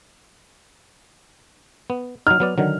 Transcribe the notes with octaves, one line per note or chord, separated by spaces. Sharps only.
B3
F#3 D#4 F6
F#3 B3 D5
D3 D#3 F#3